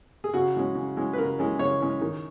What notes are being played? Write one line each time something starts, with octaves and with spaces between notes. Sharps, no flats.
G#4
C#3 F#4
E3 G#3 C#4
C#3
E3 G#3 C#4
B4
C#3 A#4
E3 G#3 C#4
C#3 C#5
E3 G#3 C#4
D#3